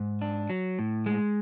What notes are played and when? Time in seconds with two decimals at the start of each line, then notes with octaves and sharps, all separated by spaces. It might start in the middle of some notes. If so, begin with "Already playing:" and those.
Already playing: G#2
0.22 D4
0.50 F#3
0.79 A2
1.06 G#3